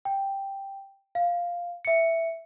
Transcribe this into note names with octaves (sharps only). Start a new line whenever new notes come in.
G5
F5
E5 C#7